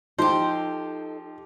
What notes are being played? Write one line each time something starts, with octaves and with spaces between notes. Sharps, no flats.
F3 D#4 G4 A4 C5